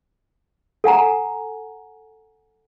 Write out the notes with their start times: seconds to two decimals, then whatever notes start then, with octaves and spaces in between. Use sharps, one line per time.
0.84 A4 F#5 G#5 A#5